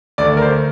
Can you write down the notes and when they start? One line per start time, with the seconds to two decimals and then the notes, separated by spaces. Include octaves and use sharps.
0.18 D2 D5
0.37 A#4
0.42 C5